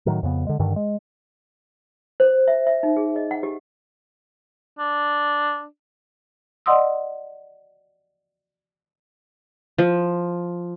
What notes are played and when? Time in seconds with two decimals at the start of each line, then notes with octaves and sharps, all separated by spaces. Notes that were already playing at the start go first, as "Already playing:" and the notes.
0.06 A2 D#3 F#3
0.23 F2 C#3 B3
0.47 D3 G#3
0.59 G2 D3 D#3
0.76 G#3
2.20 C5
2.48 E5
2.67 E5
2.83 D#4
2.97 G#4
3.16 D#5
3.31 F#5
3.43 G4
4.79 D4
6.66 D5 D#5 F#5 C6 D#6 E6
9.78 F3